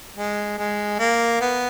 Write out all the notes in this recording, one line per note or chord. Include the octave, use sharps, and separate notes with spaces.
G#3
G#3
A#3
B3